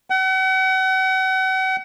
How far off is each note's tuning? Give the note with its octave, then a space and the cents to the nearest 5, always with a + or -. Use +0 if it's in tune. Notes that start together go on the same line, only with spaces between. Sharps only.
F#5 +40